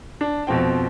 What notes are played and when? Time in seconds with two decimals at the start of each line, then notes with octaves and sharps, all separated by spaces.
0.21 D4
0.47 F2 B2 F3 C4 G5